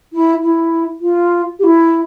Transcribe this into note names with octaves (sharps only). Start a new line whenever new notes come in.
E4
E4
F4
G4
E4